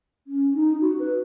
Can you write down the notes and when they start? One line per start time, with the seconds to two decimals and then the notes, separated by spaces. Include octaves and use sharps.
0.27 C#4
0.54 D#4
0.81 F#4
0.99 B4